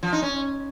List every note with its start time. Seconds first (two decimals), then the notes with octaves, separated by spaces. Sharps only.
0.03 F3
0.13 D#4
0.22 C#4